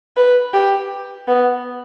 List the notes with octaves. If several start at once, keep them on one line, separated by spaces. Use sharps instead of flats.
B4
G4
B3